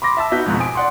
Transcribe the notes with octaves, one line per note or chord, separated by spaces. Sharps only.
B5 C6 D6 A#6
E5 A5 E6
B3 D#4 F#4 G6 B6
F2 G#2 B2
G#5 D#6 D7
D5 F#5 C6